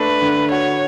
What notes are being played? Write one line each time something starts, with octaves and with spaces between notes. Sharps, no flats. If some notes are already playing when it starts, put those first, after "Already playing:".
Already playing: A3 D4 B4
D3
F#4 C#5